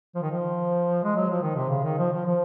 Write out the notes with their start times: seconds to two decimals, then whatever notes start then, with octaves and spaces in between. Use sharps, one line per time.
0.15 F3
0.22 D#3
0.30 F3
1.04 G#3
1.16 F#3
1.29 F3
1.42 D#3
1.55 C3
1.69 C#3
1.84 D#3
1.97 F3
2.12 F3
2.26 F3